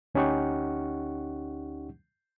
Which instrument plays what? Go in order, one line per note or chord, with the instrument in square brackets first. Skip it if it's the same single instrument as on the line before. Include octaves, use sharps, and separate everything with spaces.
[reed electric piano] D2 C#4 D#4 G4 F#5 C#6